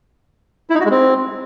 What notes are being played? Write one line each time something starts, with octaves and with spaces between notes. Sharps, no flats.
E4
D#4
F#4
G#3
C4